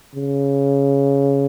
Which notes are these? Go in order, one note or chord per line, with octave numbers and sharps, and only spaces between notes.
C#3